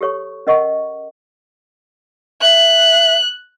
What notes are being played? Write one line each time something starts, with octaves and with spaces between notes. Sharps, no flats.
G4 A4 C#5 C#6
C#4 A#4 D#5 F#5 C#6
E5 F#6